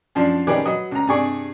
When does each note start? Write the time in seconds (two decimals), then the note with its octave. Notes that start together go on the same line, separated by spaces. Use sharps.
0.15 F#2 F3 D4
0.47 D#3 C#4 G4 G#4 B4 D5
0.66 F#3 B4 D#5
0.91 C#2 A#5
1.07 G2 C3 G#4 D5 C#6